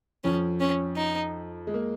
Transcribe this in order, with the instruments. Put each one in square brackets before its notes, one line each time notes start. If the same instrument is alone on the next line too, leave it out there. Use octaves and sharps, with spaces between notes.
[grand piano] F2 F3 [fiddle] C#4
[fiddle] C#4
D#4
[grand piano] G#3
A#3